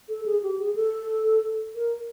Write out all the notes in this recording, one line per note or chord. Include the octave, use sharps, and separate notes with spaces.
A4
G#4
G4
G#4
A4
A#4